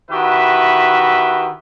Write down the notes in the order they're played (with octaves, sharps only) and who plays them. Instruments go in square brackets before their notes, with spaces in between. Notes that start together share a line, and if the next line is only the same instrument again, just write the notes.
[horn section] D#3 E4 F#4 G4 B4 E5